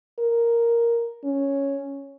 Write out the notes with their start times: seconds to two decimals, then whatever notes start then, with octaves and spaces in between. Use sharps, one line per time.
0.19 A#4
1.24 C#4